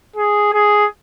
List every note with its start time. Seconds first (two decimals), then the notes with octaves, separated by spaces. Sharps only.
0.16 G#4
0.53 G#4